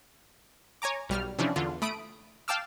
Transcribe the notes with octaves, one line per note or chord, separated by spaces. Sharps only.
C#5 G#5 A#5 D6
B1 G3 F6
C3 E3 F3 C#4 D4
E2 D3 F4
A3 B5 D#6 D7
F5 G5 A5 D6 E6 F6